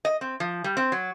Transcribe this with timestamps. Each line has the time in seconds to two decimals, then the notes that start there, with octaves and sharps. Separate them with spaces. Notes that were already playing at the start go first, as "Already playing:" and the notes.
0.05 D#5
0.21 C4
0.40 F3
0.64 G3
0.77 C4
0.92 F#3